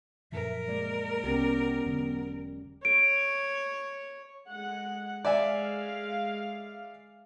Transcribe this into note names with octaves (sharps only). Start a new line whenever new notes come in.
F#2 A#2 F3 A#4 E5
G#3 A#3 D5
C2 B3 C#4 G4
E1 D3 F#3
C#5 D7
G#3 F#5
G#3 D5 E5 F5 G#5